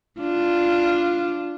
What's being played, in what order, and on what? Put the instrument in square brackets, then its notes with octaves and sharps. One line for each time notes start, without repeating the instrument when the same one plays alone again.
[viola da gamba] D4 F4